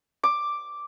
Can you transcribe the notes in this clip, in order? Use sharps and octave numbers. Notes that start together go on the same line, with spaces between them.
D6